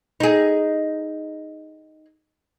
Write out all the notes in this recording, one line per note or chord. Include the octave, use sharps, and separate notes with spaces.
D#4 G#4